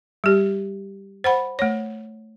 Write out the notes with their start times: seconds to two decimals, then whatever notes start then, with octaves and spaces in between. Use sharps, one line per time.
0.24 G3 G4
1.24 C5 F#5 B5
1.59 A3 C#5